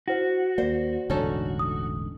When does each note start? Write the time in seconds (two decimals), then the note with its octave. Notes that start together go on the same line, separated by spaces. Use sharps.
0.08 E4 F#4 C5 F#5
0.58 D#2 A#3 C5 D5
1.10 E1 A1 D3 C#4 D#4 A4
1.59 D#6